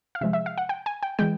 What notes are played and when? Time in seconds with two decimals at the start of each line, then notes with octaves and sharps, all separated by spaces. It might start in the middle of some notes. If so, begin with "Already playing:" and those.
0.15 F5
0.21 C3 F3 G#3 E5
0.33 E5
0.46 F5
0.58 F#5
0.69 G5
0.86 G#5
1.03 G5
1.19 E3 G#3 G5